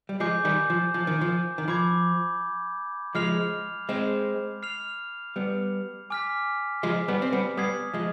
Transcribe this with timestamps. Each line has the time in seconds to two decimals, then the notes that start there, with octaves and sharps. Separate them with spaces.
0.09 G3
0.20 F3 G#3 G#5 D6 G6 C7
0.45 D#3 G3
0.70 F3
0.94 F3
1.07 D#3
1.21 F3
1.58 D#3
1.68 F3 B5 D6 G#6
3.15 F3 G#3 F6 C7 F7
3.89 G#3 C4
4.63 F6 C7 F7
5.36 G3 B3
6.10 G#5 D6 F6 B6
6.83 F3 G#3
7.08 G3 B3
7.22 C4
7.33 G3 B3
7.57 G3 B3 D#6 G#6 C7
7.94 F3 G#3